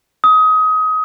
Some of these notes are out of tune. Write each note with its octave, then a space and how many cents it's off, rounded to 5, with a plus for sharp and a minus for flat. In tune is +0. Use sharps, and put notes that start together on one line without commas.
D#6 +25